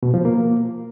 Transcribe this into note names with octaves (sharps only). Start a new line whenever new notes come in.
B2
F3
A#3